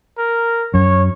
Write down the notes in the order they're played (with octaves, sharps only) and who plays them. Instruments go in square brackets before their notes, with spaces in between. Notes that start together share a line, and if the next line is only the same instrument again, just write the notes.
[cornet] A#4
[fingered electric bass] F#2 [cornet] C#5